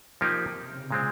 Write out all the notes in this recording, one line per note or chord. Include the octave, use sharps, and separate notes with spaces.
C3 F3 A#3 D#4 G4
C#3
A#2 G#3 C4